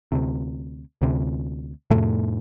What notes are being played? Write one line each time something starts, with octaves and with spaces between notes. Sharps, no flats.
D2 C3
D2 C3
F2 A2 C3 A3